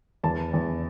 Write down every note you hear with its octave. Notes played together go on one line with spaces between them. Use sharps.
E2 A5
E2